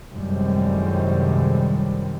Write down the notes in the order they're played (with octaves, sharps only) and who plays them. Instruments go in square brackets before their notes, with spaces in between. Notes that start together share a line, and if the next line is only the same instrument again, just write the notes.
[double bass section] F#2 A2 C3 D#3 G3 G#3